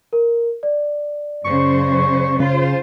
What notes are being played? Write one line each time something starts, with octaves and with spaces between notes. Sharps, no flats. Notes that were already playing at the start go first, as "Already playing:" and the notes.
A#4
D5
F#2 C#3 C5 C#6
C#3 F4 C5